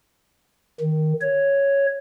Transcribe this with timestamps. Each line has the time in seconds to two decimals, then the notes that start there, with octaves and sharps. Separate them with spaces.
0.80 D#3
1.21 C#5